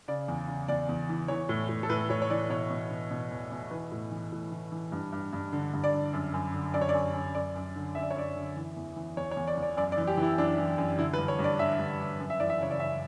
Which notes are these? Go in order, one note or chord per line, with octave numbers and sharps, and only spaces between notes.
C#3 D5
E2
C#3
E2 D5
E2
E3
E3 C#5
A2
A2
A4
A2 B4
A2 C#5
C#5
E3 D5
B2 C#5
B2
B2
B2
E2
B2
E3 B4
A2
E3
A2
E3
E3
G2
G2
G2
D3
G2
D5
D3
F#2
F#2
D3
F#2 D5
C#5
D5
F#2
F#2
F#2 D5
F#2
D3
F#2 E5
D5
C#5
F#2 D5
D3
E3
E2
E3
E2 C#5
C#5
E2
D5
E2
D5
F#2 D5
D5
E3
G4
E3
E4
F#2 D4
E3
F#2
D3 E4
B4
G2
C#5
G2
D5
D3 E5
G2
G2
F#2
E5
E3 D5
E5
C#3 C#5
D5
F#2 E5